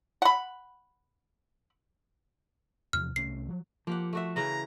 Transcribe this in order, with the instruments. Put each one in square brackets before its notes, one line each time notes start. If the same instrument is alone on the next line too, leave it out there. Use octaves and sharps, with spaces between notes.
[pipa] F#5 B5
[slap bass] E2 C3 F3 [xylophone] F6
[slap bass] C2 A3 C#4 [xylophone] C7
[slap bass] F3 F#3
[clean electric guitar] F3 [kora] A#3 G4 F#5
[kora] A3 F#4 E5
[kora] C#3 E3 [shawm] A#5